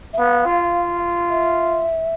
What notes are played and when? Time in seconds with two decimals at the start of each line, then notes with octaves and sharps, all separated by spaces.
0.14 E5
0.18 B3 F5
0.46 F4
1.30 E5